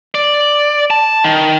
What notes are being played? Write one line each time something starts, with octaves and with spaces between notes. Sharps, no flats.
D5
A5
D#3